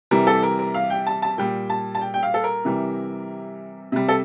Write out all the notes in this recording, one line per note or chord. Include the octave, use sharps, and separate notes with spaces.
C3 E3 G3 A#4
A4
A#4
A#4
F5
G5
A5
A5
A#2 G3 G5
A5
A5
G5
G5
F5
A4
A#4
C3 E3 G3
C3 G3
A4